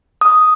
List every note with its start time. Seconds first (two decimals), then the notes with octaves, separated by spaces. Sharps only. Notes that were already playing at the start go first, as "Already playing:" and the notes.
0.21 D#6